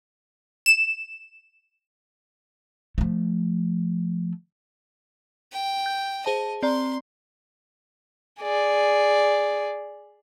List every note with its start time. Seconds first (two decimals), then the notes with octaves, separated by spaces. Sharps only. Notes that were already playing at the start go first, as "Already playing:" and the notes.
0.66 E7
2.98 F3 A3
5.52 G5
5.86 G6
6.26 G#4 C5 D#5 A5
6.63 C4 D5 A#5 C6
8.41 G#4 D5